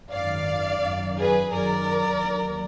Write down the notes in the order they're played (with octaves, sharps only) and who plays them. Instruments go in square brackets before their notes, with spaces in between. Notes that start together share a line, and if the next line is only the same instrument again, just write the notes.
[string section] G#1 F#2 D#3 F#3 D5 F5
F#2 D#3 F#3
G#4 B4
F#2 D#3 F#3 A#4 D5
D#2 D3 F#3